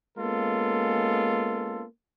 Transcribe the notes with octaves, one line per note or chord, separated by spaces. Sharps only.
G#3 A#3 B3 C#4 F4 A4